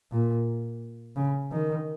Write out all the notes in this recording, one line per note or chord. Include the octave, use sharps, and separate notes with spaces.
A#2
C#3
D#3